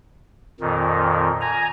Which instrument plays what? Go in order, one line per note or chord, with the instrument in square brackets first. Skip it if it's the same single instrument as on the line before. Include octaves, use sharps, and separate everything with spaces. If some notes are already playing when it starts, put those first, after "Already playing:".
[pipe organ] F2 A#2 D#3
G#5 A#5